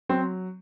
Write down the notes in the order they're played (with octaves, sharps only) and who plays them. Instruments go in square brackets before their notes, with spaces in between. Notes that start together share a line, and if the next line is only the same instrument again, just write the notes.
[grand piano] F#3 C4